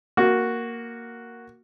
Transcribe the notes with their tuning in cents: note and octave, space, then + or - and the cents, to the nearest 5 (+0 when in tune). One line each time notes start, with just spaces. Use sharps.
A#3 +0 F#4 +0